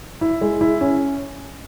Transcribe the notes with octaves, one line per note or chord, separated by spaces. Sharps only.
E4
G#3
E4
C#4